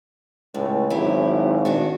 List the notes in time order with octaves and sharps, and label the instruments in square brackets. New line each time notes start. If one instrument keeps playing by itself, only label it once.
[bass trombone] C#2 [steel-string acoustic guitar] A2
[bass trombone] G#1 [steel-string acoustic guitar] F#3 E4 G4
[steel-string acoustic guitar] D#3 D4 F#4